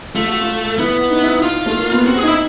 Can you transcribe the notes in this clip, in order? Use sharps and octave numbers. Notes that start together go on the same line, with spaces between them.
A3 F4
F#4
F4
B3 E4
D#4
E4
D#4
F4
A3
A#3
B3
C4 F#4
G#4
D#4 E4